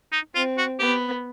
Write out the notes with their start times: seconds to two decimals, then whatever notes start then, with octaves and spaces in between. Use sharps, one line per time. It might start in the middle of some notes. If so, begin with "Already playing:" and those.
0.12 D#4
0.35 C4 F4
0.58 F#4
0.79 B3 G4